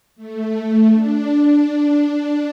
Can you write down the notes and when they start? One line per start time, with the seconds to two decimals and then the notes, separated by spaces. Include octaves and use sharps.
0.16 A3
0.54 A3
0.91 D4